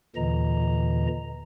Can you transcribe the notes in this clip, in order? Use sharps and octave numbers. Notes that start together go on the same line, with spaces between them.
D#2 A#2 D3 E3 D#5 A#5